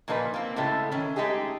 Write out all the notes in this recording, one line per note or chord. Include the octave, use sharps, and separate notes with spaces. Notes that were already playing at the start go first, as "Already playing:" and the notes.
A#2 F3 A#3 D#4 A4 B4
A#3 C4
A2 C#3 G#3 A3
D#3 E3 C#4
G#3 A3 D#4 G4 G#4